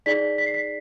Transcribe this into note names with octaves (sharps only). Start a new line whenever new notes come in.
D#4 G#4 D5 B6
B6
C7
B6